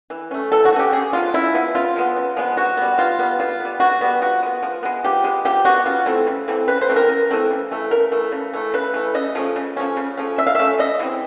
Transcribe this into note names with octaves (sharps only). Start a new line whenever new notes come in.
E3
A3 C#4
E3 A4
F#4
A3
C#4 G4
C#3 G#4
F3 G#3 B3 F4
C#3 E4
F3 G#3 B3
C#3 F4
F3 G#3 B3
C#3
F3 G#3 B3
B2 F#4
G3 B3
B2 F4
G3 B3
B2 F4
G3 B3
B2 F#4
G3 B3
F3 F#4
G#3 B3
F3
G#3 B3
F3 G4
G#3 B3
F3 G4
G#3 B3 F#4
C#3 F4
E3 A3 C4
C#3
E3 A3 C4
C#3 B4
C5
E3 A3 C4
A#4
C#3
E3 A3 C4
C#3
E3 A3
C#3 A#4
E3 A3
C#3
E3 A3
C#3 B4
E3 A3
C#3 D#5
F3 A3 C#4
C#3
F3 A3 C#4
C#3
F3 A3 C#4
C#3 E5
F5
F3 A3 C#4 E5
C#3 D#5
E3 G#3 C4